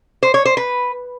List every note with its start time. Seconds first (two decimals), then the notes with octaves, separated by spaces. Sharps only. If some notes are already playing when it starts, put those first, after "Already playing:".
0.23 C5
0.34 C#5
0.45 C5
0.57 B4